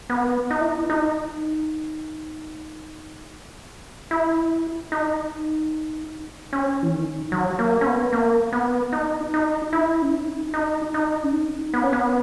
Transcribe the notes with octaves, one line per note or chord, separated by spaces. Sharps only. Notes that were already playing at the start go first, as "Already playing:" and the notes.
B3
D#4
E4
D#4
E4
D#4
E4
D#4
C#4
E3
D#3
F#3
A#3
C#4
B3
A#3
B3
D#4
D#4
E4
C#4
D#4
D#4
D#4
C#4
D#4
B3
C#4
B3